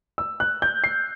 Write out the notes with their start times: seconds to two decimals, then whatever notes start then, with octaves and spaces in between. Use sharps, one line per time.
0.18 E6
0.40 F#6
0.62 G6
0.84 C7